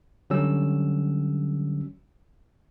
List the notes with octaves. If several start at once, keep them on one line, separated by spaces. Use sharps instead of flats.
D3 F#3 G3 C#4 E6